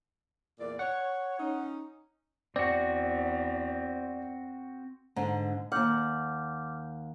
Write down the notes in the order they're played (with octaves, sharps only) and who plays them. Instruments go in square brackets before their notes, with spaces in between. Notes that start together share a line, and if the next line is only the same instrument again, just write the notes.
[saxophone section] E2 A#2 D5
[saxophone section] C#5 [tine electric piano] F#5
[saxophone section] C#4 D#4
[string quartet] E2 [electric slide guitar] C4 F#4 [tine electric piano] D5
[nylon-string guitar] G#2 D3
[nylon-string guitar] D#2 F#5 [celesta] D6 F6 G6